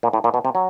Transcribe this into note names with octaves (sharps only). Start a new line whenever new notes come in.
A#2
A2
A#2
B2
C3
F#3